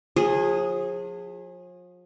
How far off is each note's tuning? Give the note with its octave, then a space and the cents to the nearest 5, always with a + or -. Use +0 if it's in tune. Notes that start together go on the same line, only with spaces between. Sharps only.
F3 +40 G#4 -10